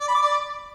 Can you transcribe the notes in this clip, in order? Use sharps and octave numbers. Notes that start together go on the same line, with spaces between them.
D5
B5
D6
D5